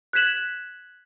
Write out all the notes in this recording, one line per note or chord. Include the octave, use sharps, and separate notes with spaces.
F#6 G#6 B6 E7 F#7